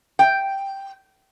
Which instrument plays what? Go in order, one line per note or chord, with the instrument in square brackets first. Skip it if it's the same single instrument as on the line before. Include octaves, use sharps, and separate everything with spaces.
[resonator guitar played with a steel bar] G5